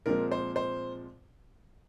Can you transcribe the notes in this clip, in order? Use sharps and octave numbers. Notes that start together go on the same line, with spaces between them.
A#2 F3 G#3 C4 A#4
C5
C5